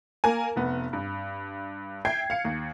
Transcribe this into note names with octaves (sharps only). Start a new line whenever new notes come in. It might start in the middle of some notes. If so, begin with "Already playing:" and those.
A#3 A#4 G#5
F1 B3
G2
E5 G5 G#6 C7
F5 C#7
D#2